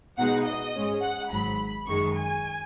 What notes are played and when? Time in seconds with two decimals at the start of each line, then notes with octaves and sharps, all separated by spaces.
0.18 B2 G#3 D#4 F#5
0.46 D#5
0.75 G#2 G#3 C#4
1.02 F#5
1.31 G#1 G#2 F#3 B5
1.86 F#2 D#3 G#3 C#6
2.15 G#5